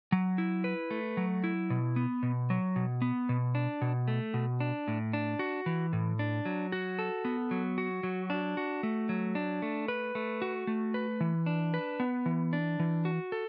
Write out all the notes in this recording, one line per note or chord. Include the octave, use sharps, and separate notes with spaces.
F#3
E4
B4
A3
F#3
E4
B2
B3
B2
F#3
B2
B3
B2
D4
B2
A3
B2
D4
A2
D4
F#4
E3
A2
D4
F#3
F#4
A4
B3
F#3
F#4
F#3
D4
F#4
A3
F#3
D4
A3
B4
A3
F#4
A3
B4
E3
D4
B4
B3
E3
D4
E3
F#4
A4